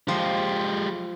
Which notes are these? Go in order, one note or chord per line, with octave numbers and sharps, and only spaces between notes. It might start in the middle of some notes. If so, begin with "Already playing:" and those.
F3 G#3 G4